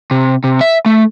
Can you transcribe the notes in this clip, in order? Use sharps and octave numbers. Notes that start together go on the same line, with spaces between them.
C3
C3
E5
A3